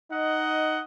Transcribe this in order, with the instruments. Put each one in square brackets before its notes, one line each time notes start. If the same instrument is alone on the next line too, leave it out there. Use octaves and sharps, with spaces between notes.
[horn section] D#4 D#5 F#5